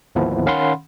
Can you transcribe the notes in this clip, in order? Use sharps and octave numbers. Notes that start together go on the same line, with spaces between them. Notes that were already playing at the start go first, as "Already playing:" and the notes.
G#1 D2 F3 A#3 B3 E4
D#3 C#4 F5 F#5 B5 C6